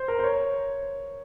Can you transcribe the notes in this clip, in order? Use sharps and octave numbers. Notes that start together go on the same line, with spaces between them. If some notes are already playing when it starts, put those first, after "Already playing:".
Already playing: C5
A#4
C5
C#5